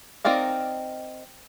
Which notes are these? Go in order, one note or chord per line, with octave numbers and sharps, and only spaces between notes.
C4 D#4 A#4 D5 F5